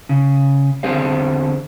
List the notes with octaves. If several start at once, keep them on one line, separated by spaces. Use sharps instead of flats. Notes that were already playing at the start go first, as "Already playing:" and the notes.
C#3
E2 D3 C4 G#4 C5 F5